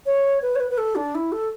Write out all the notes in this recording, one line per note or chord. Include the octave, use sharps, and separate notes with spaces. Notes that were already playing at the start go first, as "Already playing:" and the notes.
C#5
B4
C#5
B4
B4
A4
D4
E4
A4